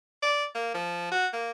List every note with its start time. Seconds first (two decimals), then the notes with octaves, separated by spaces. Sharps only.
0.23 D5
0.55 A#3
0.75 F3
1.11 F#4
1.33 A#3